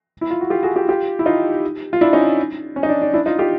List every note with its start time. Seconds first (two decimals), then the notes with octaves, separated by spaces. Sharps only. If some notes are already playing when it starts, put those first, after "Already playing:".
0.21 E4
0.31 F4
0.41 F#4
0.50 F4 G4
0.63 F#4 G#4
0.76 F4 G4
0.88 F4 G4
1.19 E4
1.26 D#4 F4
1.93 F4
2.01 D4 E4
2.13 C#4 D#4
2.76 C#4
2.83 D#4
2.89 D4
3.02 D4
3.13 D4 E4
3.26 D#4 F4
3.38 F4 G4